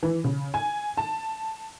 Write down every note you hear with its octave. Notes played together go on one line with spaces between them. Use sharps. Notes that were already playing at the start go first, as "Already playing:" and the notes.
E3
C#3
G#5
A5